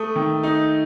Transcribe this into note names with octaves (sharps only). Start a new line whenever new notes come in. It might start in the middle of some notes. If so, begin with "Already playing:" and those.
Already playing: A3 D#6
D#3
D#4